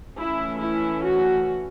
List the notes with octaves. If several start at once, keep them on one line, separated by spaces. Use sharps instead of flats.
E3 A3 C#4 E4
E4
F#4